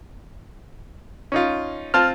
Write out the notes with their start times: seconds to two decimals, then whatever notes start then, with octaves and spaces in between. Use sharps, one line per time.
1.32 C#4 D#4 F4
1.94 C4 F4 A5 F6